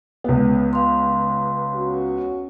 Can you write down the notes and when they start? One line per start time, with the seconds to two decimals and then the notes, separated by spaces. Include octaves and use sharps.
0.24 C#2 B3
0.73 F5 C6
1.73 C#4 F#4